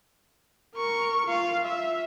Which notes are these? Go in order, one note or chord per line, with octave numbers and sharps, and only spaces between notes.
A#4 C#6
F4 F5
E5